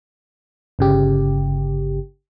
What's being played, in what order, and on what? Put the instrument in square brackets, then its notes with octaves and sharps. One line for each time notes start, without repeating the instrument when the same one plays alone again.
[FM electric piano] G1 C#3 G4